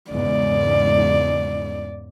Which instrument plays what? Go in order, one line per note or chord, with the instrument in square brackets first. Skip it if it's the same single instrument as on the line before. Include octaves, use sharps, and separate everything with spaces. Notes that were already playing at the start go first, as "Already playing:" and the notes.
[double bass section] E2 G#2 C#3 [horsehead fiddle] D5